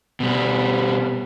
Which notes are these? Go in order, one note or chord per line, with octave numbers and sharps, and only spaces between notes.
B2 G3